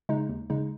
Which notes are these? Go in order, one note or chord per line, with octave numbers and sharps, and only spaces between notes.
C#3 G#3 D#4
D#2
C#3 G#3 D#4